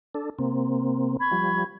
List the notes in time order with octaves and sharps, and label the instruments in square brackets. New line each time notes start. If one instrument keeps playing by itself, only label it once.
[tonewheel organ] D4 A4
C3 A#3 C4
[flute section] B5 C#6 G#6
[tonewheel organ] F3 G3